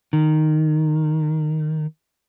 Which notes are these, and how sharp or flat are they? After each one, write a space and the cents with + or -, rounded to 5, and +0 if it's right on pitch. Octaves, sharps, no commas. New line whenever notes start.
D#3 -10